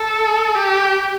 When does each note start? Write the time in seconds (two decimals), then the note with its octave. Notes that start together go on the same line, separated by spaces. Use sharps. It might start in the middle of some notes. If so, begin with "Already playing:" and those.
Already playing: A4
0.55 G4